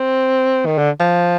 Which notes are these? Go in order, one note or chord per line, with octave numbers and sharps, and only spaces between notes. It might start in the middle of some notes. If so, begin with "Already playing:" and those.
Already playing: C4
D#3
D3
F3